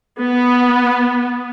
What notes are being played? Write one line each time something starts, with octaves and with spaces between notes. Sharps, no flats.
B3